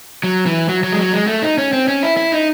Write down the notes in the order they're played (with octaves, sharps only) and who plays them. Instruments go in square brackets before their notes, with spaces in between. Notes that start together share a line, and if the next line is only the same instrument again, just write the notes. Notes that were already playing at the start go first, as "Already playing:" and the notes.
[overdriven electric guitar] F#3
E3
F#3
F#3
G#3
F#3
G#3
A3
D#4
C#4
C4
C#4
E4
E4
D#4